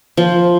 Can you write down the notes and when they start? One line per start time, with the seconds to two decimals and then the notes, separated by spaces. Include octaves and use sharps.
0.17 F3